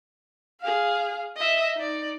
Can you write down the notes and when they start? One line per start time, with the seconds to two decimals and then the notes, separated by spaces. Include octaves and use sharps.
0.61 G#4 F5
1.37 D#5 E5
1.75 D#4 D5